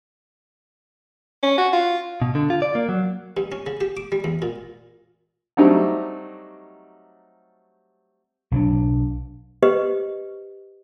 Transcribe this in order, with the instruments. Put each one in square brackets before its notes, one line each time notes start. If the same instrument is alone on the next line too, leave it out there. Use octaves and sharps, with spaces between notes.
[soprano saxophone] C#4
F#4
F4
[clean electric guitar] B2
D3
F4
D5
A#3
F#3
[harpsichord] G2
C#4
C#3
G4
D6
G3
E2
A#2
[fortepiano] F#3 G3 A3 C4 D#4 G4
[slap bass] B1 F#3 G3 D4
[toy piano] G4 B4 C5 D#5